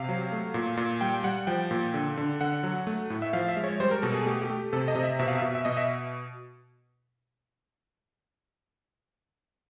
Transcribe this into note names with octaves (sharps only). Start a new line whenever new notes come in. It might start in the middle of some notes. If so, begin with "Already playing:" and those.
Already playing: C3 F5
F#3
A3
A#2
A#2
G3 G5
G3 F#5
F3 G5
A#2
D3
D3
D3 F#5
F#3
A3
A2
E5
F3 F5
E5
G#3
C#5
G3 C5
A#4
B2 A4
G#4
A3 G4
G4
A3
C3 A4
D#5
C3
E5
B2 E5
F5
E5
B2
E5
B2 D#5
E5